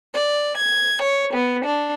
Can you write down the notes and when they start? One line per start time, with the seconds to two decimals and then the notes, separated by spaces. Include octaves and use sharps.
0.14 D5
0.58 G#6
1.02 C#5
1.33 B3
1.64 D4